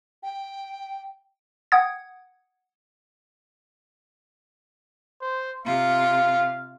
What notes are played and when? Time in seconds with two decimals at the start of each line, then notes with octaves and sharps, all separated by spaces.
0.23 G5
1.72 F#5 G5 D#6 G#6
5.22 C5
5.66 C3 F4 F5